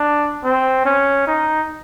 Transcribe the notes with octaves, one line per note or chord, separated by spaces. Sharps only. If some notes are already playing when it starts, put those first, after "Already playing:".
Already playing: D4
C4
C#4
D#4